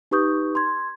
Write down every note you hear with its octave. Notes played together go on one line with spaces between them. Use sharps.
D#4 G4 B4 C#6 D#6 G6
C6 G#6